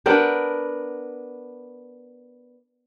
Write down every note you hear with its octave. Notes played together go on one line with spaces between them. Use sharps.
B3 D4 A#4 G5